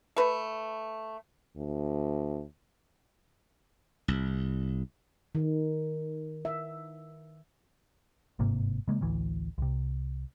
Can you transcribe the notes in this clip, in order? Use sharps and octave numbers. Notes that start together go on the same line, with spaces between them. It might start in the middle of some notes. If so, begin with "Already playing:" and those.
A3 B4
D2
C2
D#3
E5
G1 G#2 C3 A#3
C#3 G#3 A#3
A1 D2 E3
C2 C3